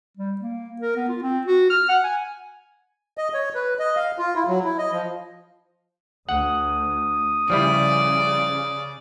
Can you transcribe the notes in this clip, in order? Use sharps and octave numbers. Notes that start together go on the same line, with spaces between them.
G3
A#3
A#4
B3
F4
C4
F#4
F6
F#5
G#5
D#5
C#5
B4
D#5
F5
F4
E4
F#3
E4
D#5
F3
D2 F#5 D#6
C#3 F3 G3 E4 D5